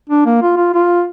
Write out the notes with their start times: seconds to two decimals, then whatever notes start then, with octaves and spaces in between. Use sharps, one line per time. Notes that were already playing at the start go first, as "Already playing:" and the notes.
0.10 D4
0.26 A#3
0.42 F4
0.57 F4
0.74 F4